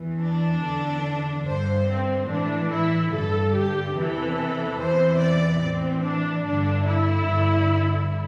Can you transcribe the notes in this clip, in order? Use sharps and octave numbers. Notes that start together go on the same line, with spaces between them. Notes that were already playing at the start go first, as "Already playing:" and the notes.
Already playing: E2 E3
D4
E2 D3
G2 D3 C5
C4
A2 E3 D4
E4
G2 D3 A4
G4
E2 C3 E3 A4
E2 C3 E3 C5
D5
A2 E3 C4
D4
G2 D3 D4
E4
G2 D3